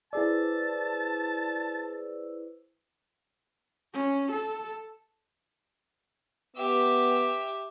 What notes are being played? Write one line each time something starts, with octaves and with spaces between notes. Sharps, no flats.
E4 G#4 B4 C5 D5 A5 E6
C#4
A4
B3 G4 E5